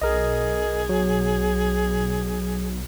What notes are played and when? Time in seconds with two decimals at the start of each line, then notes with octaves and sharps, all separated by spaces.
0.02 B1 G#4 A#4 D#5
0.89 F#3